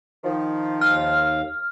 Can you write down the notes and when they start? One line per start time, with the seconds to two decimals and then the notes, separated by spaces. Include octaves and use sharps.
0.24 D#3 F3
0.81 D#2 F5 F6